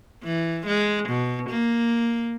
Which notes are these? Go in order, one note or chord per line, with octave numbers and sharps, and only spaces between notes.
E3
G#3
B2
A#3